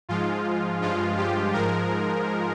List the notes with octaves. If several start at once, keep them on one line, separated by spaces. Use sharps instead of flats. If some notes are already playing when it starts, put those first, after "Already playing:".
G#2 F3 G#3 F4
G2 F3 G#3 F4
G4
G#2 F3 G#3 A#4